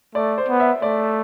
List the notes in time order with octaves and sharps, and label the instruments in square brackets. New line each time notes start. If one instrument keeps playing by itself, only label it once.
[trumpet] A3 [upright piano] D5
[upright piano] C5
[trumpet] B3
[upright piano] E5
[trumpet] A3 [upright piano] D5